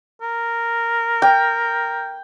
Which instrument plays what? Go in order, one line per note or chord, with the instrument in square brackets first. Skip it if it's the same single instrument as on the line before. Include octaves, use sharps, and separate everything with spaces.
[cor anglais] A#4
[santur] G5